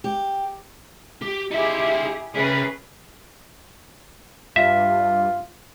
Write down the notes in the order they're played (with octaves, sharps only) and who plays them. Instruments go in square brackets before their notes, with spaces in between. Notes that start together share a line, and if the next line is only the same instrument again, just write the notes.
[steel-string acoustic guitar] G4
[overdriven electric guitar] G4
[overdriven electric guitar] D#4 E5 [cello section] E4 G4 G#4
[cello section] C#4 G#4 B4 [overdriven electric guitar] E4 A#4
[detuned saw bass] G2 [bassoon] F4 [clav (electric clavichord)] E5